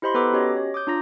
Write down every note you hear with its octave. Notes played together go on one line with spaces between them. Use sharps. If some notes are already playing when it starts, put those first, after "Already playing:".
E4 G4 C5 D#5 B5 C6
B3 A4 B4 A#5 D6
C#4 F#4 G4 C#5 D#5
C#5
D6 D#6 G6
D4 F4 A#5 A#6